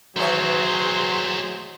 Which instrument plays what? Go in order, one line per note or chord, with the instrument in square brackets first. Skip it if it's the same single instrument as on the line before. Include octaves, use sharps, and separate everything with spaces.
[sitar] D#3 E3 C#5 [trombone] F#3 [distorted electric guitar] A3 C4 [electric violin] G#4 C5